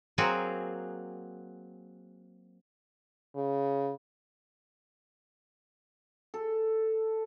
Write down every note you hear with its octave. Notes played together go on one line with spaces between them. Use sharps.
F#3 A#3 C4 F#4 G#4
C#3
A4